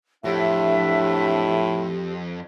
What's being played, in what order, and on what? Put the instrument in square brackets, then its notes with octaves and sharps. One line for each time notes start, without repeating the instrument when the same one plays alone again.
[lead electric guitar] F2 [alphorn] A2 [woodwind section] F#3 D4 E5 [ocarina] G4